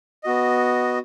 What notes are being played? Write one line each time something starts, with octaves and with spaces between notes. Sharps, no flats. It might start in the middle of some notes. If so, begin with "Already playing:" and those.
B3 F#4 D#5